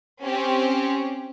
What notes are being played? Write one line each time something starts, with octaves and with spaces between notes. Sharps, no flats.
C4 C#4 G4